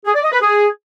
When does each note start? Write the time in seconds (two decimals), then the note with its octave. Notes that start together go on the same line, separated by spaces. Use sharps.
0.05 G#4
0.14 D5
0.23 D#5
0.32 B4
0.41 G#4